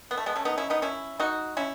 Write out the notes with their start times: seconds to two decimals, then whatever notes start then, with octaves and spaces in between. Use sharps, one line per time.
0.11 B3
0.17 A3
0.26 G#3 B3
0.35 A3 C#4
0.45 B3 D#4
0.58 C#4 E4
0.70 B3 D#4
0.82 C#4 E4
1.20 D#4 F#4
1.57 C#4 E4